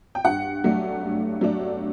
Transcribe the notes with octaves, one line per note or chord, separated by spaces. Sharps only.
G5
G2 F#5
F#3 A3 D4
G2
F#3 A3 D4